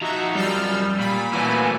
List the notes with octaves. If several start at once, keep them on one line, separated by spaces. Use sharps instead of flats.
F3 D#4 F#4 E5 A#5
F#2 F3 G3 E6 F6 G6
A#2 B5
E3 F#3 A3 G#5